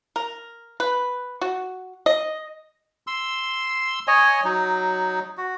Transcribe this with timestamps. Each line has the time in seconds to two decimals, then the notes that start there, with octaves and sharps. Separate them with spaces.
0.16 A#4
0.80 B4
1.41 F#4
2.06 D#5
3.07 C6 E6
4.08 C#5 D#5 G#5
4.44 F#3 D#4
5.37 F#4